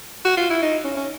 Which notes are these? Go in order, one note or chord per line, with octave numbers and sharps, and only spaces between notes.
F#4
F4
E4
D#4
C#4
C#4